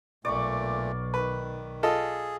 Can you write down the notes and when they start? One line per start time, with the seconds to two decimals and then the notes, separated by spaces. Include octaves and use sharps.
0.25 B1 A#2 A3 D5 C#6 D6
1.14 D#3 B4
1.83 F4 G#4 A4 D#5